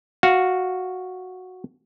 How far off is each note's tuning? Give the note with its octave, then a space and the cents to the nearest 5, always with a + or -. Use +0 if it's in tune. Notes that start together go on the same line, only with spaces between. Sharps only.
F#4 -5 F5 +0